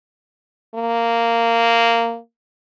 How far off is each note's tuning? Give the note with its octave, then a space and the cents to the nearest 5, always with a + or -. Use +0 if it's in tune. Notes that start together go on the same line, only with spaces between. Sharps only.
A#3 -10